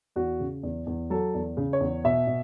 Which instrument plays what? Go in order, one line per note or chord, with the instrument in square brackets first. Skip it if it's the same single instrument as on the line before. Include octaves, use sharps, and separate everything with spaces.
[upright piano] E2 F#4
C#3
E2
E2
F#3 A4
E2
C#3
C#5
E2
B2 E5
B2